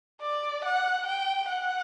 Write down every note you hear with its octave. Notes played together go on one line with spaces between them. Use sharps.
D5
F#5
G5
F#5